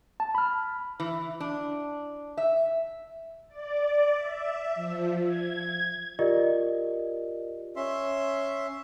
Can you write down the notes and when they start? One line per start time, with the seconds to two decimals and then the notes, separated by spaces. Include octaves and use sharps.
0.20 A5
0.35 B5 F6
1.00 E3
1.40 D4
2.37 E5
3.48 D5
4.16 E5
4.75 F3
5.25 G#6
6.19 F4 G4 A#4 D5 D#5
7.76 C#4 E5 C6